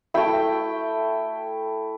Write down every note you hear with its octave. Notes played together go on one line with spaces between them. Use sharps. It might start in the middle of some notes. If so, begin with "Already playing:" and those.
A3 E4 G5